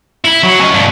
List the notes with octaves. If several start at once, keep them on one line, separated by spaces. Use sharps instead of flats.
E4
F#3
C#4 D#5
G2 B2